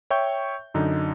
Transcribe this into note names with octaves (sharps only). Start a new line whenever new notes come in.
C#5 E5 G5 C#6 G6
F#2 D3 D#4